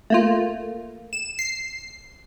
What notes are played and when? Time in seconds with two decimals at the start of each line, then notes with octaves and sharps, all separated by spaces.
0.10 A3 A#3 F4
1.13 E7
1.39 C7